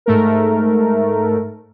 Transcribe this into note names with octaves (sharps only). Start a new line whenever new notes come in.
G#2 A3 A#4